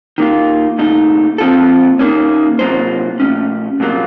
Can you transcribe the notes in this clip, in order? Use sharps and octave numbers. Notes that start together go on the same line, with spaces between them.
D#3 A#3 F4
C2 A#2 A3 D#4
A#2 F3 C4 F4 A4
D#3 A#3 C#4
C3 F#3 A#3 F4 C5
A#2 A3 C#4
C2 A#2 F#3 A#3 F4